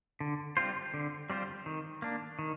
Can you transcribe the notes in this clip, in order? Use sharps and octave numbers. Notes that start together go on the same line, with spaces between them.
D3
G3 C4 F4 C5
D3
G3 C4 F4 C5
D#3
A#3 D4
D#3